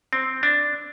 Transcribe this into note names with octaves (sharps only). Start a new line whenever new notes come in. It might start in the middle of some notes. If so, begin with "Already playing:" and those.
C4
D4